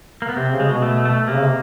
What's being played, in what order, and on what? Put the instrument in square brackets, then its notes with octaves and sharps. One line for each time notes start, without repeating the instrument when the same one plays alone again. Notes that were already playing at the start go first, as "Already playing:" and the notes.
[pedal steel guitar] A#3
B3
[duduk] C3 [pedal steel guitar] C4
[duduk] C#3
[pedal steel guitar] G#3
[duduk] B2
[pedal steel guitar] A3
A3
[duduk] C3 [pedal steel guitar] A#3
[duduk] C#3
C3